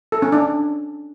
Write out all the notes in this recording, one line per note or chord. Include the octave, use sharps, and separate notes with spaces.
A4
C#4
D4